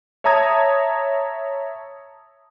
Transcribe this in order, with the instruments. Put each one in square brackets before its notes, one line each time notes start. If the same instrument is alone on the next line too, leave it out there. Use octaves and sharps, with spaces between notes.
[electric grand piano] C#5 E5 A5 A#5 D#6 G#6